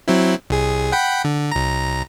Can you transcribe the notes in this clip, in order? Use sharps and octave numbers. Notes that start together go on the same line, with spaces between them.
F#3 C4 E4
C2 G#4
F#5 G5 B5
D3
C2 A#5